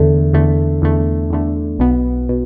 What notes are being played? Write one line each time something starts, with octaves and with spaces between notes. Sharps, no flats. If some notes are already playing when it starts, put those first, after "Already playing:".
Already playing: E2 D3 A3
E2 D3 A3
E2 D3 A3
E2 D3 A3
B1 B2 B3
B2